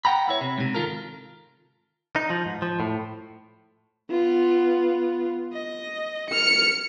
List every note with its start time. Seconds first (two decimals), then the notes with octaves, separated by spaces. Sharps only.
0.05 F#5 G5 A#5 B5
0.27 B3 E4 C#5
0.41 C3
0.58 G#2 C3
0.74 D#3 F4 A4 A#4
2.16 D#4
2.30 F3
2.46 G#2
2.62 F3
2.80 A2
4.11 B3 F4
5.53 D#5
6.30 F6 C#7